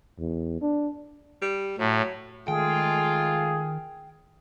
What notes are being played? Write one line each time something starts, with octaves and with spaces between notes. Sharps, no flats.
E2
D4
G3
A2 F#3
D#3 G#3 A3 F4 G#4 G5